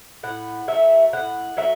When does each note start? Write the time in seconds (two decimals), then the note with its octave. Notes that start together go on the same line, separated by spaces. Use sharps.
0.23 A2 F#5
0.68 F#3 A3 E5
1.13 A2 F#5
1.57 F#3 A3 E5